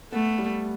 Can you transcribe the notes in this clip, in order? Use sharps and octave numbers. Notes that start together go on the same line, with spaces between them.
A3 B3
G3